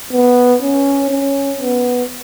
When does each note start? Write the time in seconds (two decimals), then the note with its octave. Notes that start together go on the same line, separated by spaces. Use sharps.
0.13 B3
0.62 C#4
1.11 C#4
1.60 B3